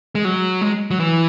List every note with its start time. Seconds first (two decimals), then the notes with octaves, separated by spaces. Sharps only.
0.15 G#3
0.25 F#3
0.61 G#3
0.91 F#3
1.00 E3